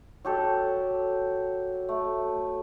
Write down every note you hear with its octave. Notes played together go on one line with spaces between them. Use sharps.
F#3 G4 A4
A3